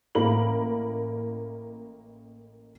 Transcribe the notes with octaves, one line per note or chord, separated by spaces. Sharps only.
A1 A#3 E4 A#4 B5 F#7